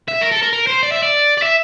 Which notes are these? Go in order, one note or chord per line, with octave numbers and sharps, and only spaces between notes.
E5
A#4
A4
A#4
A#4
C5
D5
E5
D5
D5
E5